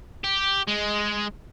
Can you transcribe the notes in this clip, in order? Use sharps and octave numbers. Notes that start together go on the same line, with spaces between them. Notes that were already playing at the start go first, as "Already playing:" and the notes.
G4
G#3